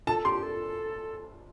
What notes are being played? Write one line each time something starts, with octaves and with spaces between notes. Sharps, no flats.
A4 A5
G4 C6
A4